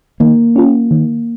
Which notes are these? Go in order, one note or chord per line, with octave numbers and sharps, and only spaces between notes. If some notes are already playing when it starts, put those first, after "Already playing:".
D#3 A#3
C#4 F4
D#3